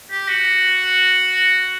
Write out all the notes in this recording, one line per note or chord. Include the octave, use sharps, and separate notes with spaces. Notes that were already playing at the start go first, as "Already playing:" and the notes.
G4
F#4